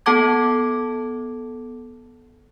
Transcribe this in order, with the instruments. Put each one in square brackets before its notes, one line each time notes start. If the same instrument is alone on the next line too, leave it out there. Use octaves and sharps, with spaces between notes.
[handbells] B3 A4 F#5 A5 D6 G#6